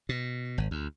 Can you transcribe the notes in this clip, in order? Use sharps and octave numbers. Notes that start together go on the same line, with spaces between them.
B2
G#1
D2